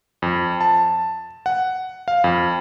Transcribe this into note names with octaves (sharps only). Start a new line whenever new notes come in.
F2
A5
F#5
F5
F2